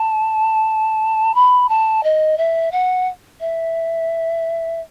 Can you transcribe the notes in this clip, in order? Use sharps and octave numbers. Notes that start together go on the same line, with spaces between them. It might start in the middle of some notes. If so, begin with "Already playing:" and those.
Already playing: A5
B5
A5
D#5
E5
F#5
E5